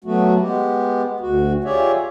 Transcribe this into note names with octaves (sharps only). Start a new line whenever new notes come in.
F#3 A3 B3 F#4
G#3 B3 G4
D2 F#4
F4 G4 G#4 C#5 D5 E5